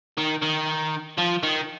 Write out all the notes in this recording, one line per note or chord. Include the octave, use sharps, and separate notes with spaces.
D#3
D#3
F3
D#3